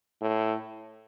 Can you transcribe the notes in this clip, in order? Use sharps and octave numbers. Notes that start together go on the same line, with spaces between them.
A2